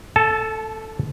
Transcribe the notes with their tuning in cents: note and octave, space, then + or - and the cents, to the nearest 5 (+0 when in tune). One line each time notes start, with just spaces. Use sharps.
A4 +5 A5 -25